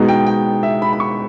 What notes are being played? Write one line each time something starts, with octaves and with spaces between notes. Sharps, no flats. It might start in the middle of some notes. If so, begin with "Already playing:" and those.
Already playing: B2 G#3 B3 D#4
G5
G5
E5
B5
B5
C#6